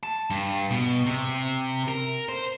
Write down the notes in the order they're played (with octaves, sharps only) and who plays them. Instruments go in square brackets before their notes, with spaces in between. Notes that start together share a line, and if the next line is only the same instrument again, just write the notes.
[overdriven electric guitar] A5
G2
B2
C3
A#4
C5